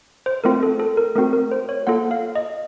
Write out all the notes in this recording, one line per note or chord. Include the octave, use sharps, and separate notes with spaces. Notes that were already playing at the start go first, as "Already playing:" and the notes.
C5
A3 C4 F4 A#4
A4
A4
A#4
A3 C4 F#4 A#4
A#4
C5
C#5
A#3 F4 A4 F#5
F5
D#5